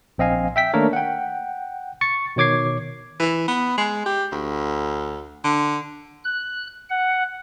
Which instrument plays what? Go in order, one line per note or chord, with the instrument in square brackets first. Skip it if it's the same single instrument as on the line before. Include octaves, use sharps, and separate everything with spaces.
[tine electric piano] A#1 C4 D#5 F5 G#5
E5 G5 B6
D#3 A3 A#3 D4 A#4 C#5
F#5 G5
C#6 A6 C#7
B2 D#3 C#5 D6 G#6 C7
[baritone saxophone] E3
B3
G#3
G4
D2
D3
[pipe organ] F#6
F#5